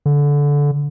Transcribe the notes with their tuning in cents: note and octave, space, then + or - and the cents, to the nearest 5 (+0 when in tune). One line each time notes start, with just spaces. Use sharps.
D3 -20